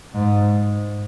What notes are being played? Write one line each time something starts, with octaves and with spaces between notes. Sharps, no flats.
G#2